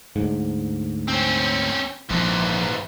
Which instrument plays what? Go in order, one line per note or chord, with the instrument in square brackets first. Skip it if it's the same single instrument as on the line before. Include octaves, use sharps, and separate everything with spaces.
[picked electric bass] D2 G#2
[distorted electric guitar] C4 C#4
[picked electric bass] A#1 [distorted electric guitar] G#2 E3